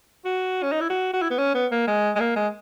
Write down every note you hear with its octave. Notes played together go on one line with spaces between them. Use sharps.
F#4
C#4
D#4
E4
F#4
F#4
E4
B3
C#4
B3
A#3
G#3
G#3
A#3
G#3